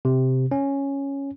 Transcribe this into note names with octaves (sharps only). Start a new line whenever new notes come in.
C3
C#4